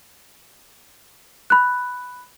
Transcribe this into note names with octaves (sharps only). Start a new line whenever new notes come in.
B5 F#6